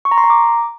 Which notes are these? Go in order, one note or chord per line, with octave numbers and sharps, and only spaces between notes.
C#6
A#5
C6
A#5
D6